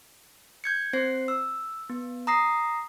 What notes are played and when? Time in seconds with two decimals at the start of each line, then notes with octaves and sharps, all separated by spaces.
0.64 G6 G#6 C#7
0.93 C4 C5 C7
1.28 E6
1.90 B3
2.27 A#5 D#6 A#6 C7